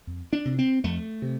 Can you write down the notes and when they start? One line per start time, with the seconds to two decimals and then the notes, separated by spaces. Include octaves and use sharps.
0.07 F2
0.33 D4
0.45 C3
0.59 C4
0.84 F2 A3
1.22 C3